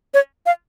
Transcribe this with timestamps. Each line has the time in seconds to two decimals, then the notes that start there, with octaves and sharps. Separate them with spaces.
0.14 C#5
0.46 F5